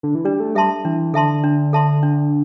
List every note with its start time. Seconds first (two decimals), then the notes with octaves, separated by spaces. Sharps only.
0.03 D3
0.15 E3
0.25 G3 D4
0.40 A3
0.55 G3 A4 E5 A5 C6
0.85 E3 D4
1.13 D3 A4 E5 A5 C6
1.44 D4
1.73 A4 E5 A5 C6
2.03 D4